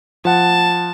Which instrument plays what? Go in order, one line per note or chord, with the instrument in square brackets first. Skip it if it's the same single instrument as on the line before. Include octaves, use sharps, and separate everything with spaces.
[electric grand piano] F3 F#5 [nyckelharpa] A5